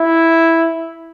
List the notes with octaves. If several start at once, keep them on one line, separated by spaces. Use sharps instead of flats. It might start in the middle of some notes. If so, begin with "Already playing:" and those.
Already playing: E4